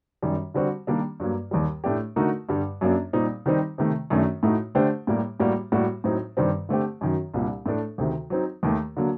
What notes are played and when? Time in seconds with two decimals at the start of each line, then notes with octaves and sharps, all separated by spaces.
0.23 F#2 D#3 G3
0.54 D3 G3 C4 F#4
0.87 D#3 G3 A#3 D4
1.20 G2 F#3 A#3
1.51 D#2 D#3 G3
1.84 A2 A3 D4 G4
2.16 D3 A3 D#4 F#4 A#4
2.49 G2 D3 G3
2.81 F#2 F#3 A#3 D4
3.13 A#2 G3 C4 D#4
3.46 D#3 G3 C4 D#4
3.78 C3 D#3 A3
4.10 F#2 D#3 A3 D4
4.43 A2 A3 D#4 F#4
4.75 D3 A3 D4 G4 C5
5.07 A2 G3 A#3
5.40 A2 G3 A#3 F#4
5.72 A2 G3 A#3 F#4
6.04 A2 F#3 C4 D#4
6.37 G2 D#3 G3 C4
6.69 D3 A3 C4 G4
7.01 F#2 D#3 F#3
7.34 C2 A#2 G3 D4
7.66 A2 A3 D4 A4
7.98 D2 C3 D#3
8.30 F#3 C4 D#4
8.63 D#2 D#3 A3
8.97 D3 F#3 A#3